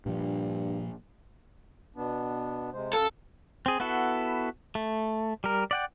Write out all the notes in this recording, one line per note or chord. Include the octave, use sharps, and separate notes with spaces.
G2 A#2 F3
B2 B3 D4
C3 G#3 C5
F#2 A4 F5
C4 G#4
B3 E4 F#4 A4
A3
G3 A#4
D5 F#5 G5